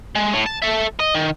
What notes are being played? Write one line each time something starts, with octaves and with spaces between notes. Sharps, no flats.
G#3
A2
A5
A4 E5
D#5
D#3